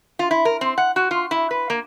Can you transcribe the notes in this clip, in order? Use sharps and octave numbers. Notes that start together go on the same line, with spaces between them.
F4
E4
A#4
C4
F#5
F#4
F4
E4
B4
A#3